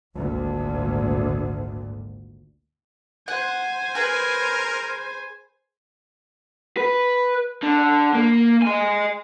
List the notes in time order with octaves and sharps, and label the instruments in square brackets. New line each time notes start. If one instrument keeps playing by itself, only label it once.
[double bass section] G#1 D2 A#2
[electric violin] C5 G#5 [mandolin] F#5
[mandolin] G#4 B4 [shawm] A#4
[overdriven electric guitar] B4
D3
A#3
D#5 G#5